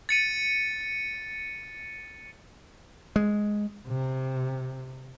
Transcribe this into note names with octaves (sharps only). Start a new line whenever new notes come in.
A6 C#7 D#7
G#3
C3